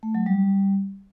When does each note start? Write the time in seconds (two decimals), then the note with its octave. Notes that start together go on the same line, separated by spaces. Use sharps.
0.03 A3
0.15 F#3
0.26 G3